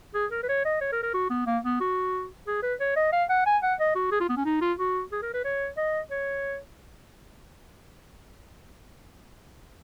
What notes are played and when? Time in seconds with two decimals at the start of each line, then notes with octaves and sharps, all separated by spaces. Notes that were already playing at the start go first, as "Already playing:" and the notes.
0.14 G#4
0.31 A#4
0.43 B4
0.49 C#5
0.65 D#5
0.81 C#5
0.92 A#4
1.03 A#4
1.14 F#4
1.30 B3
1.47 A#3
1.64 B3
1.81 F#4
2.47 G#4
2.63 B4
2.80 C#5
2.96 D#5
3.12 F5
3.30 F#5
3.46 G#5
3.63 F#5
3.80 D#5
3.95 F#4
4.12 G#4
4.20 F4
4.29 B3
4.37 C#4
4.45 D#4
4.61 F4
4.79 F#4
5.12 G#4
5.22 A#4
5.34 B4
5.45 C#5
5.77 D#5
6.11 C#5